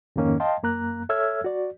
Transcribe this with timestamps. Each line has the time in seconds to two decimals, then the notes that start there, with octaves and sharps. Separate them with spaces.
0.16 F2 G#2 D#3 A#3 C#4
0.40 D#5 F5 G5 A5 C6
0.63 F#2 A#3 A#5 F#6
1.09 A4 C#5 E5 E6 F6 G#6
1.44 F#4 D5